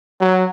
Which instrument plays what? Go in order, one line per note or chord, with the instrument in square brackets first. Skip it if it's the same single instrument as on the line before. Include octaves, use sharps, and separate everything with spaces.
[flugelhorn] F#3